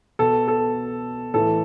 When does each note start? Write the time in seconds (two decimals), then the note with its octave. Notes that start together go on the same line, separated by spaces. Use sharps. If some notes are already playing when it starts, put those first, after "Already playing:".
0.19 B2 A4
0.48 A4
1.34 A2 E3 A4